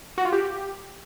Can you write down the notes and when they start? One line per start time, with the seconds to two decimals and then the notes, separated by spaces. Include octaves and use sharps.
0.18 F#4
0.25 F4
0.32 G4